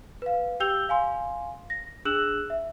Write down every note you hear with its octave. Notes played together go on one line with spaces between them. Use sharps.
B4 F5
G4 G5 E6 G6 F7 G7
F5 G#5 C6
A#6
D4 G#4 E6 F#6 E7 F#7
E5